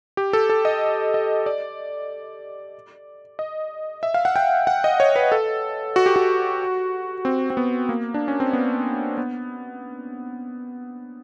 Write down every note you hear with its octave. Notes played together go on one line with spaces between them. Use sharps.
G4
A4
A4
D#5
D#5
D5
D#5
E5
F5
F#5
G5
F#5
D#5
C#5
B4
A4
F#4
G4
F#4
C4
C4
B3
A#3
D4
C#4
C4
B3
B3